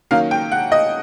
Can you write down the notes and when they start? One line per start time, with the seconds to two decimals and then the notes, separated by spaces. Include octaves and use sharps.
0.11 D#3 F#3 A#3 C#4 F5
0.31 G5
0.51 F#5
0.72 D#5